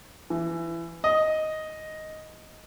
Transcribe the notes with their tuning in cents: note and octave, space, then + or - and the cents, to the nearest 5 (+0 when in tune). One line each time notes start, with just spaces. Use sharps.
E3 +20
D#5 +5